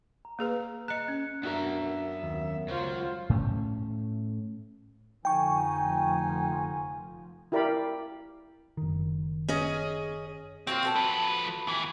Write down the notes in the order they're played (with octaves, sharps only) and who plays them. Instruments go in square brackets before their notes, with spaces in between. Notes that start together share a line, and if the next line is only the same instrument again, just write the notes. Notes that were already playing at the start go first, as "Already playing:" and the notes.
[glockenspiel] A#5
[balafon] A#3 G#4 B4
[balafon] D#5 A#5 [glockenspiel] F#6 C#7
[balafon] C#4
[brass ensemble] F#2 [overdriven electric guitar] B3 A#5 [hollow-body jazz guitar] D4 F#4 A#4 [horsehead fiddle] E5
[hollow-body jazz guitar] D#2
[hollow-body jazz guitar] C#2 [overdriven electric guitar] F#3 [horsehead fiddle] F4 C5
[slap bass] A2 A3 C#4
[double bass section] F1 F3 [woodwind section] D3 D#4 G#5 [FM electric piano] G5 C#6
[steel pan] E4 G4 A#4 D5 F5 B5
[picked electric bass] F#1 D#3
[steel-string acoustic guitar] C#4 G#4 D#5
[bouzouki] F#3 A#3 F4 [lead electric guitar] C4
[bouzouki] F#3 A4 A5
[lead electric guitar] F3 B4
D#2 E3